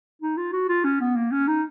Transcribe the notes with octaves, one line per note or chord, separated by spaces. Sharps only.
D#4
F4
F#4
F4
C#4
B3
A#3
C#4
D#4